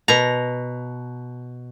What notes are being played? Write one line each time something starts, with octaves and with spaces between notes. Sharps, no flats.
B2 A#5